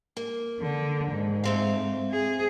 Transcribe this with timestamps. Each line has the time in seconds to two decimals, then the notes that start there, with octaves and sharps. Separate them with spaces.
0.17 A#3
0.60 D3
1.11 G#2
1.44 A3 C4 F5
2.12 G#4